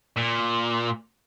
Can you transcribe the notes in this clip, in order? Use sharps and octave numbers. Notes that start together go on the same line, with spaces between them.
A#2